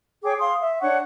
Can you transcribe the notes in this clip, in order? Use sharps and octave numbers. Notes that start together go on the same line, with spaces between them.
G#4 C#5 G5 D6
F5 C6 D#6
E5
D4 C#5 F#5 C#6